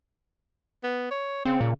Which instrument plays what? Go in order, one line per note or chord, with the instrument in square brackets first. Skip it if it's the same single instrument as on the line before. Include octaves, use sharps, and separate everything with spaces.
[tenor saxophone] B3
C#5
[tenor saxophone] C#3 [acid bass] C4
[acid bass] A#2